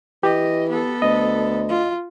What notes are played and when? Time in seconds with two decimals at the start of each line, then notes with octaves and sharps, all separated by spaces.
0.23 E3 G4 D#5
0.69 B3 A4
1.02 D2 D#5
1.69 F4